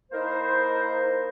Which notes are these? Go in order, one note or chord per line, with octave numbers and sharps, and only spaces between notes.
A#3 D#4 E4 A#4 C5